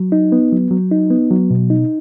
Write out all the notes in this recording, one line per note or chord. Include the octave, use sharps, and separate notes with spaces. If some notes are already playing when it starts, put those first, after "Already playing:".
Already playing: F#3
D#4
B3
F#3
F#3
D#4
B3
F#3
B2
D#4